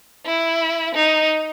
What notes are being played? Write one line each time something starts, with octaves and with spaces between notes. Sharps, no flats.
E4
D#4